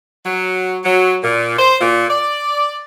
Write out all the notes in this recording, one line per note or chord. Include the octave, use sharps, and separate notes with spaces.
F#3
F#3
A#2
C5
A#2
D5